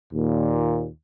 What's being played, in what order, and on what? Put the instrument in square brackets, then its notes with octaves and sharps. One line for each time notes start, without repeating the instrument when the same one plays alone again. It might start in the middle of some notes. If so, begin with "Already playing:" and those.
[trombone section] D#2 A#2